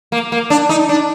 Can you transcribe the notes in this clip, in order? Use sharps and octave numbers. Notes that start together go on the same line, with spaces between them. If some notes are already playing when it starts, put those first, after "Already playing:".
A#3
A#3
D4
D#4
D4